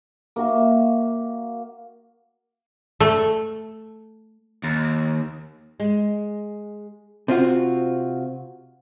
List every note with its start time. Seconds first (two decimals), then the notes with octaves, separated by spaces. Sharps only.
0.36 A#3 F#4 E5
3.00 A3
4.64 D#2
5.80 G#3
7.28 C3 C4 F4 F#4